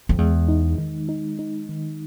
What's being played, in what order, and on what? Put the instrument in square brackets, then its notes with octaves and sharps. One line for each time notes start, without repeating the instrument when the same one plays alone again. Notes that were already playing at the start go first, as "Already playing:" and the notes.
[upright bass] F2
[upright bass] E2 [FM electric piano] G#3
[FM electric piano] D#4
D#3
D#4
D#4
D#3